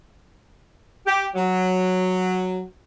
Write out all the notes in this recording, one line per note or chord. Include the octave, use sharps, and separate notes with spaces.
G4
F#3